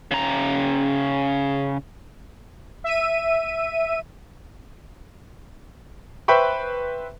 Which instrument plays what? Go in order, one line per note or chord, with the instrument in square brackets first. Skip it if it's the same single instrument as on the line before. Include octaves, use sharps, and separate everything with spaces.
[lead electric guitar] C#3 A#5
[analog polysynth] E5 D#7
[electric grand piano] B4 C5 E5 G5 B5 C#6